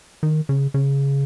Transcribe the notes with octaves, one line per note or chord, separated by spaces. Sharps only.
D#3
C#3
C#3